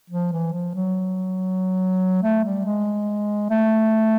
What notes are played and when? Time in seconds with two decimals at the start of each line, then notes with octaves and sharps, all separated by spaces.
0.10 F3
0.32 E3
0.53 F3
0.75 F#3
2.23 A3
2.44 G3
2.65 G#3
3.50 A3